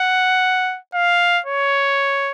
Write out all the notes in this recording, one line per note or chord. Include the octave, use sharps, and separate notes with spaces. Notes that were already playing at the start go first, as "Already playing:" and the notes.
Already playing: F#5
F5
C#5